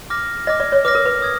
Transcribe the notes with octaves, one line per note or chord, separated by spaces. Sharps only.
D6 F6 A#6
D#5 D6 F6 A#6
D5
C#5
B4 D6 F6 A#6
A#4
B4
D#6 G#6